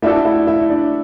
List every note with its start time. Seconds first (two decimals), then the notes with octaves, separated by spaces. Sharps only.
0.02 A3 D4 E4 F#4 A4 E5
0.25 E4 E5
0.47 E4 E5
0.70 D4 D5